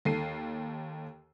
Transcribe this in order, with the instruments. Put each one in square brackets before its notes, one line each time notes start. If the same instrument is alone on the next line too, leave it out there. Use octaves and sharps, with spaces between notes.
[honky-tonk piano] D#2 A4 C7 D#7